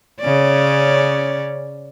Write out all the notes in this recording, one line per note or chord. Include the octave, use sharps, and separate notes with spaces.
C#3 C#4 D5